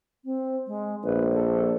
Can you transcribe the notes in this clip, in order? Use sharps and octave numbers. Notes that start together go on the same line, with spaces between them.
C4
G#3
A#1 B4
A4